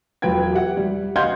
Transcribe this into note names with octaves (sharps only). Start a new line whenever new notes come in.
E1 F#3 F4 B4 G5 G#6
G4 E5 F#5
G3
D#5 F5 F#5 C6 G6 G#6